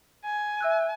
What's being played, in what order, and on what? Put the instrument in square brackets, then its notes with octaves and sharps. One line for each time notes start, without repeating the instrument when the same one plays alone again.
[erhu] G#5
[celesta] E5 E6 F#6